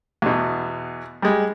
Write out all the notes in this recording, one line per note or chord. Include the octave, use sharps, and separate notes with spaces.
E2 B2
G3 G#3